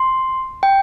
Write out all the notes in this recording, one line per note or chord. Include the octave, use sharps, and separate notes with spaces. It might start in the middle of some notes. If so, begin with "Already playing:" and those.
Already playing: C6
G5